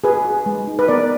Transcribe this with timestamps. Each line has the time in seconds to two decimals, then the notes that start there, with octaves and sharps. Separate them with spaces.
0.04 F#4 G#4 B4
0.25 F#4
0.46 G#3
0.68 D#4
0.79 B4
0.88 B3 A#4 D5